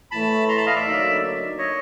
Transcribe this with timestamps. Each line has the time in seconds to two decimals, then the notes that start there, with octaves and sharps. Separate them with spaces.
0.11 A2 E3 A3 A5 B5
0.49 A#5 C6
0.57 A5 B5
0.66 D#5 F5
0.76 D5 E5
0.85 D3 F#3 A#3 D#4
1.58 C#5 D#5